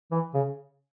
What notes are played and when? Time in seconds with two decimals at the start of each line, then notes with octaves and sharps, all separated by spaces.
0.12 E3
0.34 C#3